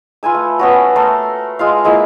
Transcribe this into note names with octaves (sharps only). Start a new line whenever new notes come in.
F4 B4 G#5 E6
A3
B3 C#4 F#4
A3 A4 A#4 C6
G#3 F4 F5
G#3 A#3 E4 F4